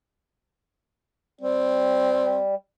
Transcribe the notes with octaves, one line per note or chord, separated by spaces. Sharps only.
G3 C4